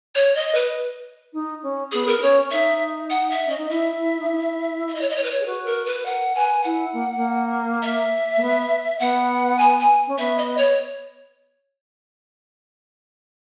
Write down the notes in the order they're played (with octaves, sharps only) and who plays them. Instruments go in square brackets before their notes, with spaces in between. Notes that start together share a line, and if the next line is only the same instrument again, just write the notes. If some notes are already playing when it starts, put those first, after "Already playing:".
[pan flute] C#5
D#5
B4
[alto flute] D#4
C#4
[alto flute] B3 [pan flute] G#4
[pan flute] A#4
[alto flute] D#4
[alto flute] C#4 [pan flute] C#5
[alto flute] C#4
[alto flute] D#4 [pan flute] E5
[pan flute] F#5
E5
[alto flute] C#4 [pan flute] D#5
[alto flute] D#4
[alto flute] E4 [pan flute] E5
[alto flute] E4
D#4
E4
[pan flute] E5
D#5
C#5
D#5
C#5
B4
C#5
[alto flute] G#4
[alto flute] F#4 [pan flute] B4
[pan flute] A#4
B4
[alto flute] A#4 [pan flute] F#5
[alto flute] B4 [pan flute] G#5
[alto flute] E4 [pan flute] F#5
[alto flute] A#3
A#3
[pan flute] E5
[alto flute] A#3
B3
[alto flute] B3 [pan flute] F#5
[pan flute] G#5
G#5
[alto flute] C#4
[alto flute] B3 [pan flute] E5
[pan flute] D#5
C#5